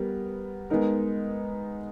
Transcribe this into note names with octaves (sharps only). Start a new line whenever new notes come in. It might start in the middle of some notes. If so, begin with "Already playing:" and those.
Already playing: G3 B3 A#4
G#3 B3 D#4 A#4